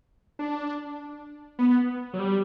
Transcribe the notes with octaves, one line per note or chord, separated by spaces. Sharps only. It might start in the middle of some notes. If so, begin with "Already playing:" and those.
D4
B3
F#3
G3